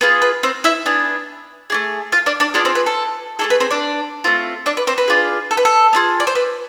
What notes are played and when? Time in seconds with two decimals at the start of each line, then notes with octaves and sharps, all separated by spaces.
0.01 B3 F4 G#4 B4
0.22 B4
0.43 C4 C5
0.64 E4 E5
0.86 B3 D4 G#4
1.70 A3 D4 G#4
2.12 F4 F5
2.26 D4 D5
2.40 D4 D5
2.54 B3 D4 F4 G#4 D5
2.65 C4 C5
2.75 B4
2.86 A4
3.39 A3 D4 G#4 A4
3.50 B4
3.60 C4 C5
3.71 D4 D5
4.24 A3 C4 F4
4.66 D4 D5
4.77 B4
4.87 C4 C5
4.98 B4
5.08 D4 F4 G#4
5.51 A4
5.57 B4
5.65 A4
5.93 B3 D4 F4 G#4
6.20 D5
6.27 C5
6.35 B4